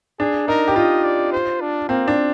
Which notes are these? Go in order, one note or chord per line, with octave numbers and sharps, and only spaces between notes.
D4 G#4
D#4 A#4
G4
F4 D#5
D5
C5
D4
A#3 C4
D4